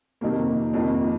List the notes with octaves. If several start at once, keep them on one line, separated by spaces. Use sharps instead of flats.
F2 C3 D#3 A#3
F2 D#3 A#3 F4